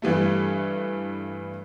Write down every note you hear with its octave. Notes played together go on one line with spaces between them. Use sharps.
G2 E3 G3 A3